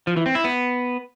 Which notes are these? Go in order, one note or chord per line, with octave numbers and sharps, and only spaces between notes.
F3
E3
C4
E4
B3